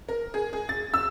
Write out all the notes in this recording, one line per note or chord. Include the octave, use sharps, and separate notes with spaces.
A#4
G#4
G#4
A6
E6